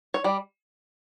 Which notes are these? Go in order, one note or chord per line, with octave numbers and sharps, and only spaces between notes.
C#5
G3 D5